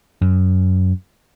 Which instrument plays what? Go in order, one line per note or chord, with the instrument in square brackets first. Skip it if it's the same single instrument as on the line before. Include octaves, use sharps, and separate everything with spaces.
[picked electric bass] F#2